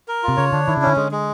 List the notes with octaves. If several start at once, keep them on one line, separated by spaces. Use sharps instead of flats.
A#4
F4
C3
C#3 C#5
D3 D4
D#3 E4
C#3
D3 C#4
D3 G#3
G#3